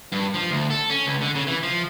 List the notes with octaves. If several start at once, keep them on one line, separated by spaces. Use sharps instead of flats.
G2
F3
D2
A4
C#4
C#2
D3
C#3
E3
F3